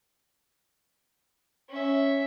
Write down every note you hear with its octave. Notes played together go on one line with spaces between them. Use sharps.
C#4 E5